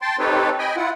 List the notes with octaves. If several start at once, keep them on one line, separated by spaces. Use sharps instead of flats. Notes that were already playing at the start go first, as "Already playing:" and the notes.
G5 A5 C6
C4 D#4 G4 A4 B4 C#5
D#5 G5 G#5 B5
E4 F4 F#5